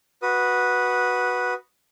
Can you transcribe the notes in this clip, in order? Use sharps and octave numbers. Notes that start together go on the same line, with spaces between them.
F#4 B4 D#6